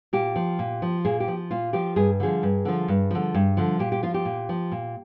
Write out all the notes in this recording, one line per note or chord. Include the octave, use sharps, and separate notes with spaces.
A#2 G4
F3
A#2
F3
A#2 G#4
G4
F3
A#2 F4
F3 G4
G2 G#4
D3 F3 G#4
G2
D3 F3
G2
D3 F3
G2
D3 F3
A#2 G4
G4
F3 F4
G4
A#2
F3
A#2